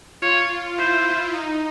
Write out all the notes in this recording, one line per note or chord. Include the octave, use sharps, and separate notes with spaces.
F4 C#5
E4 C5
D#4